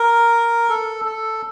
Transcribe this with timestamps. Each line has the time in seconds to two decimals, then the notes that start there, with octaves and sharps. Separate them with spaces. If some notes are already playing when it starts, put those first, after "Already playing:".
Already playing: A#4
0.69 A4
1.05 A4